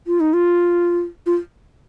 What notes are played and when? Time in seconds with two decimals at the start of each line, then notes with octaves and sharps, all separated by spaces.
0.07 F4
0.20 D#4
0.33 F4
1.26 F4